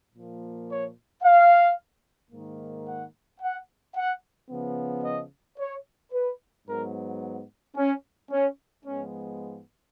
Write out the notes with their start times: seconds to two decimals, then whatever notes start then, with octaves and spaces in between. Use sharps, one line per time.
0.14 A#2 F3 A#3
0.68 C#5
1.23 F5
2.31 G#2 D#3 A#3
2.86 F#5
3.41 F#5
3.95 F#5
4.50 C#3 F3 B3
5.04 D#5
5.58 C#5
6.13 B4
6.66 G#2 F#3 B3 A#4
7.76 C#4
8.30 C#4
8.84 G#2 F3 G#3 B3 C#4